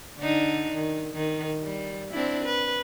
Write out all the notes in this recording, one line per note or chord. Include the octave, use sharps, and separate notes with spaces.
D3 D4 D#4
D#3
D#3
G3
C4 D4 E4
B4